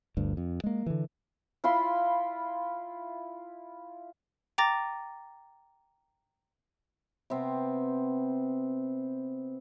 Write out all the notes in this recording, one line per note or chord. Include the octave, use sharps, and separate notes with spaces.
G1 D2 G2
F2
G#3 A#3
D3 E3
E4 F4 B5 C6
G5 A#5 D6 A6 A#6
C3 B3 C4